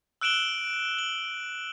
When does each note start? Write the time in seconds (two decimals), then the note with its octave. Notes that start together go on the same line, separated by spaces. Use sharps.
0.21 E6 F#6 D7 E7 F#7 G7
0.99 F#7